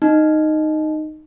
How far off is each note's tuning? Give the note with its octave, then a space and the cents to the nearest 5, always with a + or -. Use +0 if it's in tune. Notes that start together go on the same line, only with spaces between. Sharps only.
D#4 -5